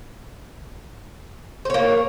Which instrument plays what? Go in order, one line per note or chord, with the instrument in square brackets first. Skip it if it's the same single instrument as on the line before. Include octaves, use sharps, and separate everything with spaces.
[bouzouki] C5
C#5
A#3